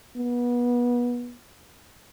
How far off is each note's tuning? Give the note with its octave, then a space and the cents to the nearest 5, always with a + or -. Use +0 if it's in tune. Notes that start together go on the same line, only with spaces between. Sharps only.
B3 -25